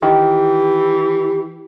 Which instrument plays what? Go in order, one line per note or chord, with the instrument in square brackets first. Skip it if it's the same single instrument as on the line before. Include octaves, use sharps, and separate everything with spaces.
[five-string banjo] D#3 [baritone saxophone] E3 [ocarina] G4